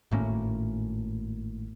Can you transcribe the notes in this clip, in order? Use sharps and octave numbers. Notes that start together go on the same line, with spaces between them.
G#1 A2 A#3 C#4